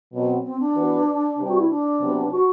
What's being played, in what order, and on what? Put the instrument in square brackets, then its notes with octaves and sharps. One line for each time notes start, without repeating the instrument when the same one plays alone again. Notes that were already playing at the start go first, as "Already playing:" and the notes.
[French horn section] B2 F#3 C4
[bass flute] C4
D4
[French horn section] E3 B3 F#4 B4
C3 G3 C4 G4 B4
[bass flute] F#4
E4
D4
[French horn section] C3 F#3 B3 F#4 B4
[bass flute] F#4